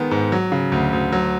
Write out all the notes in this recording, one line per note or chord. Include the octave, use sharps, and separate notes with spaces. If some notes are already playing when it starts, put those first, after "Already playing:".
Already playing: D#3 G#3 B3
G#2
F#3
C#3
D2
D2
F#3